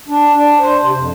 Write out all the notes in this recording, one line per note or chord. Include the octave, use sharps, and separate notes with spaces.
D4
D4
C5
C3
F2